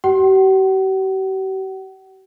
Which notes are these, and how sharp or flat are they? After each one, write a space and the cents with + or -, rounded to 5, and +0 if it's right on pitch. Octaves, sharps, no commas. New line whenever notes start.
G4 -45 F#5 +40